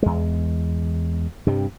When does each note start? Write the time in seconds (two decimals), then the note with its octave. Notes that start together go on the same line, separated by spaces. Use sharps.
0.03 E2 G#3
1.47 G2 C3 G3